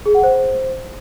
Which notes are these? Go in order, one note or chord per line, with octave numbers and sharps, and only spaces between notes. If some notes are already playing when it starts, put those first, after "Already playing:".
G#4
F#5
C5